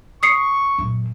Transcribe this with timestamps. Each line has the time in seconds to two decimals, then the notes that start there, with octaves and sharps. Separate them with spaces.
0.23 C#6 D#6 C7 C#7
0.78 F#2 A#2